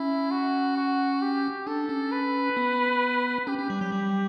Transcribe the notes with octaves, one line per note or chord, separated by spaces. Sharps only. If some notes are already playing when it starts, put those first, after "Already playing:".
Already playing: C#4 E4
F#4
F#4
G4
D4 A4
C#4
B4
B3
C#4 G4
C#4
G3
F#3
G3